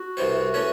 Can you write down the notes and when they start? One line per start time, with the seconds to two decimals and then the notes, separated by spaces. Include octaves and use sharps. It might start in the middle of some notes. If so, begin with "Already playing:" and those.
Already playing: F#4
0.17 C2 C3 E3 C4
0.54 E3 A3 C#4